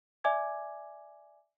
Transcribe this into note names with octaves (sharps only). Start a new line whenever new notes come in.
D5 E5 G#5 D6 G#6